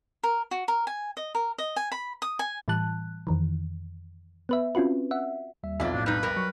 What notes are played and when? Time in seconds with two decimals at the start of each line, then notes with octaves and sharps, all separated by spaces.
0.23 A#4
0.51 F#4
0.68 A#4
0.87 G#5
1.17 D#5
1.35 A#4
1.58 D#5
1.76 G#5
1.92 B5
2.22 D#6
2.39 G#5
2.68 A2 E3 G3 A5 F#6
3.27 F2 D#3 E3
4.49 B3 B4 E5
4.75 C4 C#4 F4 F#4 B4
5.11 E5 F#5
5.63 D#2 G3 E5
5.80 B1 F2 F#3 F4 D5 E5
5.94 A2 D4
6.06 G3 D#4 B4
6.23 G3 A#4
6.36 F#3 C#6